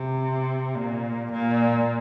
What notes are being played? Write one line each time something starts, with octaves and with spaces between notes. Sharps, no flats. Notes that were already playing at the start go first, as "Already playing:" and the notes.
Already playing: C3
A#2
A#2